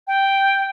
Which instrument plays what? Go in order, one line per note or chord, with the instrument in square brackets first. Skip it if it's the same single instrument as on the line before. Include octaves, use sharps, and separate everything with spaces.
[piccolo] G5